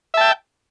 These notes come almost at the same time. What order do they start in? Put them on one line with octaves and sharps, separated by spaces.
E5 A5 G5